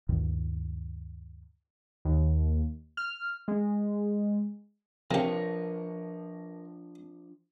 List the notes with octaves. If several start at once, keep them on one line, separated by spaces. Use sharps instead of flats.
D2 G2 A#2 D#3
D#2
F6
G#3
C3 F3 D4 G4 A#4 B4 C#5